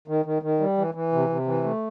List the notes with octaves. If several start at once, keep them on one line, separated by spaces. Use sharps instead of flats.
D#3
D#3
D#3
G3
E3
E3
C3
C3
E3
A3